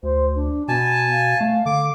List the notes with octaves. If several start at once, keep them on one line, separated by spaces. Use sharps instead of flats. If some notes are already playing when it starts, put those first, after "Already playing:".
D2 C5
D4
B2 B3 G#5 A5
F5
A3
D3 D6